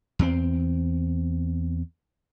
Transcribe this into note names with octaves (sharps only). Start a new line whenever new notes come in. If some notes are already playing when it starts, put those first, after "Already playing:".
E2 C4